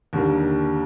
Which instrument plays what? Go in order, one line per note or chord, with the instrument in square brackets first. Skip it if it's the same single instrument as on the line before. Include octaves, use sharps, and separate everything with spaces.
[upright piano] D#2 D3 G3 A#3